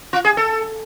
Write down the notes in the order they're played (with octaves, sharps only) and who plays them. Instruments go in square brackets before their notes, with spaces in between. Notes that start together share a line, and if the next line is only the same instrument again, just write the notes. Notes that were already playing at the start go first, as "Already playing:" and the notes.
[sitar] F4
G#4
A4